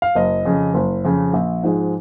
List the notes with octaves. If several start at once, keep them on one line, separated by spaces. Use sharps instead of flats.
F5
F#1 D#5
F2 C#3
F#1
F2 C#3
A#1
G#2 F3 G#3